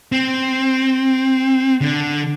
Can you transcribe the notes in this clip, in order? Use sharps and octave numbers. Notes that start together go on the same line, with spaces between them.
C4
D3